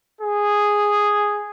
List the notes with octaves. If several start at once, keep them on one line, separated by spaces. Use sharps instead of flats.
G#4